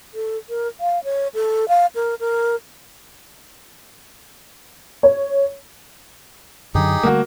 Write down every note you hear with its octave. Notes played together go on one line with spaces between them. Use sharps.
A4
A#4
F5
C#5
A4
F5
A#4
A#4
C#5
F#2 D3 F#3 D#4 G4 G#4
D3 G3 A3 A#3 F#4